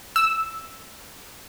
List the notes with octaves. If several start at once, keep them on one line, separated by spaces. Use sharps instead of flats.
E6